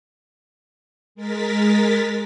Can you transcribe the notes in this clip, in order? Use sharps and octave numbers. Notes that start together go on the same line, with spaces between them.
G#3 A#4 A6 B6